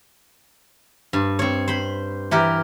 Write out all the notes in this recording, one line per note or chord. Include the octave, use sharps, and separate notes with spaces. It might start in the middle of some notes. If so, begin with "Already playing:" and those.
G2
C4 C#5
C5 B5
E3 G4 A#4